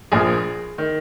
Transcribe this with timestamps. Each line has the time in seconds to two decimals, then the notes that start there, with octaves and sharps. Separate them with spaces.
0.12 A#1 A#2 F3 G#4
0.78 D#3